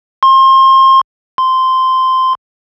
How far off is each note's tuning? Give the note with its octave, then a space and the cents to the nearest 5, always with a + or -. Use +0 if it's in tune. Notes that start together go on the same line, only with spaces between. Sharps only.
C6 +30
C6 -10